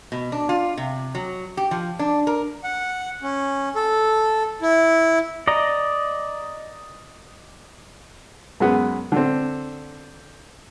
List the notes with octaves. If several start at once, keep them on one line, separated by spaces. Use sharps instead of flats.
B2
D4
F4
C3
F#3
G4
F3
D4
A#4
F#5
C#4
A4
E4
D5 D#5 A#5
F#2 G#3 B3
D3 C4